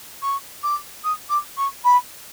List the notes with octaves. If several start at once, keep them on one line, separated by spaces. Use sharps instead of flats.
C#6
D6
D#6
D6
C#6
B5